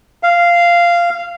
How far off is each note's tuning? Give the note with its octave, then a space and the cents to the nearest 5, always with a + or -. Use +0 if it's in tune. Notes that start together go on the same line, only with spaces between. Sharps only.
F5 -10